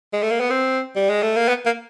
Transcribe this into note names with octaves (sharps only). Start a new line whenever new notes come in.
G#3
A3
A#3
B3
C4
G3
G#3
A3
A#3
B3
A#3